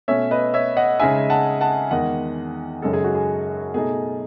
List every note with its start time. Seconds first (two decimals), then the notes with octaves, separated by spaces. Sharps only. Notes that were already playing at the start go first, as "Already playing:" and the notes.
0.08 B2 A3 C#4 C#5 E5
0.31 B4 D#5
0.54 C#5 E5
0.77 D#5 F#5
0.99 C#3 G#3 D#4 E5 G#5
1.30 F#5 A5
1.61 F#5 A5
1.91 E2 D#3 G#3 D#5 F#5
2.82 F#2 C#3 G#3 D#4 A4
2.93 G#4
3.04 F#4
3.15 G#4
3.74 B2 A3 D#4 G#4